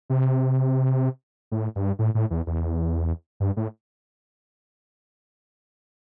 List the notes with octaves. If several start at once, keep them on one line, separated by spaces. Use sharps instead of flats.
C3
A2
G2
A2
A2
E2
E2
G2
A2